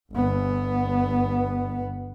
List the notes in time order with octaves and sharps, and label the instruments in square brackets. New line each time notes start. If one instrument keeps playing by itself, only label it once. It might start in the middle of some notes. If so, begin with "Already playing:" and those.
[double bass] G1 B3